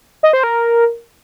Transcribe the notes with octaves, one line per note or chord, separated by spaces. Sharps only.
D#5
C5
A#4